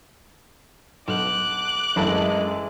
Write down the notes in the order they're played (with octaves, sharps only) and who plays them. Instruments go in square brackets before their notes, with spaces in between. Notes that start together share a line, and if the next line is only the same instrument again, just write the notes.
[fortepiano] B1 [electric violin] D6 F#6
[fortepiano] A1 F#2 A5 [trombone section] E3 G#3